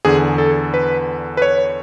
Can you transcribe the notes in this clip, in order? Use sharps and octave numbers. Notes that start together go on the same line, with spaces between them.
E2 D3 G#4
A4
B4
B4
C#5